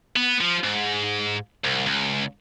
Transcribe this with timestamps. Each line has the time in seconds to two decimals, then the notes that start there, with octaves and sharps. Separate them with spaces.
0.16 B3
0.40 F3
0.64 G#2
1.64 C2
1.86 C#2